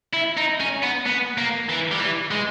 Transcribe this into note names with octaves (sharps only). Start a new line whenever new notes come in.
E4
D#4
C#4
B3
B3
A#3
E3
G3
E3
G#3